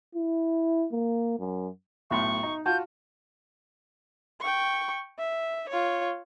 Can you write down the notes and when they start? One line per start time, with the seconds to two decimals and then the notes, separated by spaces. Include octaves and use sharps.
0.15 E4
0.92 A#3
1.39 F#2
2.11 B1 A2 C6 C#6
2.43 D#4
2.66 F4 F#4 A5 G6
4.41 G5 C#6
5.19 E5
5.69 F4 C#5